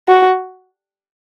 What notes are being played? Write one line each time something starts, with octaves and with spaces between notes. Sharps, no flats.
F#4